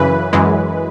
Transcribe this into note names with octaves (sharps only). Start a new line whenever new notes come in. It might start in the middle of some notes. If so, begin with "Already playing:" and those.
Already playing: F#2 C#3 E3 B4
F#2 E3 G#3